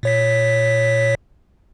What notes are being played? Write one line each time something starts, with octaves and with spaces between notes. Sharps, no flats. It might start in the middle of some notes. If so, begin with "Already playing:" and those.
A#2 C#5 B6